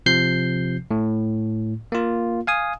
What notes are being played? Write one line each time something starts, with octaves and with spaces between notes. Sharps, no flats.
C3 F3 G6 C7
A2
A#3 F4
F5 G#5 D#6